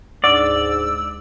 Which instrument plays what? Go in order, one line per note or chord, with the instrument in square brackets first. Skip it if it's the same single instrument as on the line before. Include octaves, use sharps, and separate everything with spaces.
[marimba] D2 D4 [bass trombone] G#2 [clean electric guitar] D5 [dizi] E6